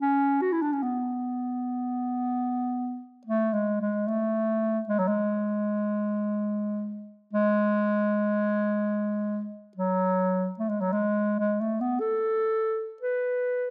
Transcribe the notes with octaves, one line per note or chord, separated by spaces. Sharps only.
C#4
F#4
E4
D4
C#4
B3
A3
G#3
G#3
A3
G#3
F#3
G#3
G#3
F#3
A3
G#3
F#3
G#3
G#3
A3
B3
A4
B4